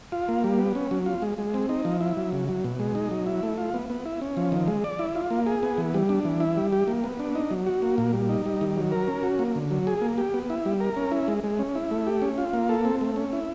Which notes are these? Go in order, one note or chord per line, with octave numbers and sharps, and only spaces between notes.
F4
A#3
G3
B3
C#4
F#3
F4
G#3
G#3
C4
D#4
F3
E4
F#3
C#3
F#3
B2
G#3
D#4
F#3
E4
A3
F4
B3
B3
E4
C#4
F3
D#3
G#3
D5
E4
F4
A#3
G#4
B3
E3
G3
D4
E3
E4
G3
G4
A#3
B3
D4
D#4
F#3
F#4
A#3
A#2
G3
D#4
G3
D#3
F#3
A#4
C#4
F#4
A#3
D3
F#3
G#4
A#3
G4
B3
E4
G3
A#4
C#4
E4
G#3
G#3
C#4
E4
A3
G4
C#4
F4
A#3
A4
C4
A3
C#4
E4